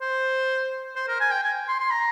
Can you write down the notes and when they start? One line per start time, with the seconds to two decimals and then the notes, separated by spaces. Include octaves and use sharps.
0.01 C5
0.96 C5
1.08 A#4
1.20 G#5
1.32 G5
1.44 G#5
1.68 C6
1.80 C6
1.91 A#5